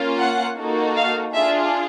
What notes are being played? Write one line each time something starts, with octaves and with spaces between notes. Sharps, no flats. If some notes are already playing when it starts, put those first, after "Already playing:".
Already playing: A#3 C#4 F4
F#5
A#3 D#4 F#4 A4
F5
D4 F4 G#4 E5